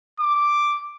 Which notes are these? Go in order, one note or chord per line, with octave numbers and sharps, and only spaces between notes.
D6